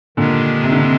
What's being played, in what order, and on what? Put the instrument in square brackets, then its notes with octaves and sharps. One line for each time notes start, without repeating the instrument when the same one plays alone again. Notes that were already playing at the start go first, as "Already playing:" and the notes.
[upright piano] A#2 D3 [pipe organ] D#3 G#3 D4 G4
[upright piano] C3
D3
C3